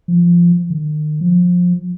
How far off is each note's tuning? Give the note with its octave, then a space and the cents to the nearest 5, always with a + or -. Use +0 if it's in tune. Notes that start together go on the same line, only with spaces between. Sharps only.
F3 -15
D#3 -40
F3 +25